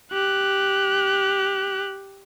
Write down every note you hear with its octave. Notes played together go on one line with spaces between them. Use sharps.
G4 F#6